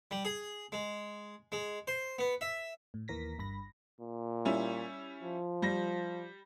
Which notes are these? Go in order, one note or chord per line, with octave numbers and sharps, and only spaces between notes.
G3
G#4
G#3
G#3
C5
B3
E5
A2
D#2 E3 A#4 A#6 B6
G1 G2 B5 A#6
A#2
G3 C#4 E4
F3
G3 A#6